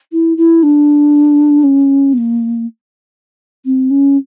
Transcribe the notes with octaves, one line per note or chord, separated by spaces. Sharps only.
E4
E4
D4
C#4
B3
A#3
C4
C#4